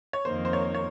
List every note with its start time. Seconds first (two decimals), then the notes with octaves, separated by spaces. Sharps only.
0.13 C#5
0.25 F2 D#3 A#3 C5
0.45 C5
0.53 C#5
0.75 C#5